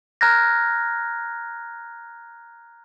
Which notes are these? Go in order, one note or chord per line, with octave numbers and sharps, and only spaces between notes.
A#5 F6 F#6 G#6 A#6